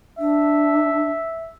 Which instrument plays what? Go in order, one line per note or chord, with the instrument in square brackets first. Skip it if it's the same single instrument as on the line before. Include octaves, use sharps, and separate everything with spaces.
[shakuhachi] D4 [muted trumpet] E5